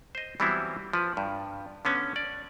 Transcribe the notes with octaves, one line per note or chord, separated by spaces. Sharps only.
C5 D#5
E3 F#3 G3 B3 C4 E4
F3 B4
G2
D3 B3 C#4
D5